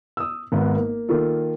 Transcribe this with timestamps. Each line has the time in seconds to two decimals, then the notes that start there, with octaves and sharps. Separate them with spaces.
0.17 D#6 E6
0.52 G#1 G#2 B3 B4
0.76 A#3
1.09 D#3 A#3 F4 A4